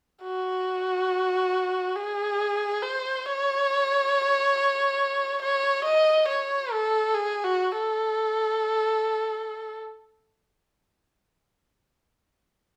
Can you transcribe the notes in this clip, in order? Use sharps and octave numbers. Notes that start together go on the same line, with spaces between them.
F#4
G#4
C5
C#5
C#5
D#5
C#5
A4
G#4
F#4
A4